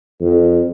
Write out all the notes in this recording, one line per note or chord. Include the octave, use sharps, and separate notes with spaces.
F2